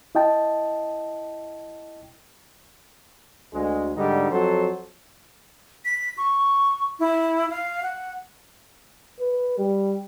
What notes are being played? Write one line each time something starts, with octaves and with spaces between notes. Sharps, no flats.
E4 D#5 G5 A5
D2 G#3
G#2 D3 G3 D#4
F2 F#3 A4 C5
B6
C#6
E4
F5
F#5
B4
G3